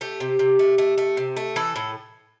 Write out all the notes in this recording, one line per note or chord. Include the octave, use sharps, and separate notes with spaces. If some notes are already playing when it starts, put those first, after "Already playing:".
A3 G4
C3
C3
A3
A3
A3
C3
A3
E3 A4
A2